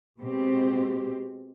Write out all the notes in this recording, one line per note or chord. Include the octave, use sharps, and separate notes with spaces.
B2 G#3 C4 G4